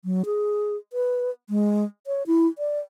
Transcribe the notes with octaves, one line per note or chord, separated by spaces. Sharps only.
F#3
G#4
B4
G#3
C#5
E4
D5